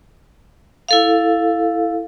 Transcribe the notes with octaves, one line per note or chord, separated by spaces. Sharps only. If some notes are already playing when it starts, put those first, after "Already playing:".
E4 A4 F5